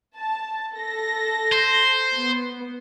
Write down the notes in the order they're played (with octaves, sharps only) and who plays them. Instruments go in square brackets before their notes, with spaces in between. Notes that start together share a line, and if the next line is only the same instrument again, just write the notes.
[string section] A5
A4 A#6
[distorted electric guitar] C5
[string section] B3